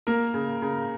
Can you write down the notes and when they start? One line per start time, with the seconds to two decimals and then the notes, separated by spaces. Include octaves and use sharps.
0.07 A#3 A#4
0.34 C#3
0.62 C#3